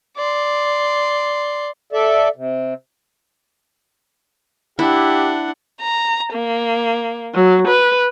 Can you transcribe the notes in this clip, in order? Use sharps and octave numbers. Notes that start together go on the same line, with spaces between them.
D5 C6
A4 D5 E5
C3
D4 E4 G4 F#5
A#5
A#3
F#3
B4